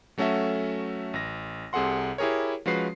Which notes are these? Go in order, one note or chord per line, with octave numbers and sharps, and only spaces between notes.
F#3 A3 C#4 F#4 A4 E5
A1 A#6
C2 C3 G#4 A4 F#5 C6
E4 G4 G#4 A#4 C#5
F3 G#3 C#4 F#4 B4 C7